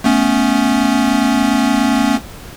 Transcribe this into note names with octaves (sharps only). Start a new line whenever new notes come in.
A3 B3 C#4